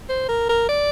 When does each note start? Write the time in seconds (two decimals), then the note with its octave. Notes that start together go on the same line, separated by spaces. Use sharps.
0.09 C5
0.29 A#4
0.49 A#4
0.69 D5